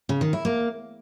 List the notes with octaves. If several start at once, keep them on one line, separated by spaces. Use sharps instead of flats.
C#3
D#3
E4
A#3